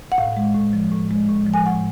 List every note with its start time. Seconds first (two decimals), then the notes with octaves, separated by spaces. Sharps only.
0.12 F#5
0.18 A2 F5
0.37 G#3
0.55 A2
0.73 F3
0.92 A2
1.11 G#3
1.29 A2
1.47 F3
1.54 G#5
1.66 A2 F#5